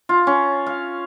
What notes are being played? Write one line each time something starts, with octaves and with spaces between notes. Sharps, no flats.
F4
C#4
F5